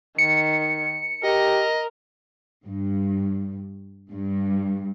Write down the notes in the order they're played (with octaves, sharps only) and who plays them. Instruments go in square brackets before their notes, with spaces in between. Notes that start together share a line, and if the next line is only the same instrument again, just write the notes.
[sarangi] D#3 [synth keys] C#7
[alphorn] G4 [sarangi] A#4 [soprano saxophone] D#5
[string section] G2
G2